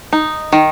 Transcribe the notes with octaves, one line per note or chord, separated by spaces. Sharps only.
D#4
D#3